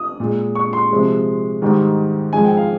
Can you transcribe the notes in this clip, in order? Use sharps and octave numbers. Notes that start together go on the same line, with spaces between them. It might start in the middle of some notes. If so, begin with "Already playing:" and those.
Already playing: D#6
A#2 G#3
C#6
C6
C3 F3 G#3
G#2 D#3 G3
G#2 F3 G#3 G#5
G5
F5